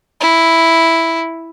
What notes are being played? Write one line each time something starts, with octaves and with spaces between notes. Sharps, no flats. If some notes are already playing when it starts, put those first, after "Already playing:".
E4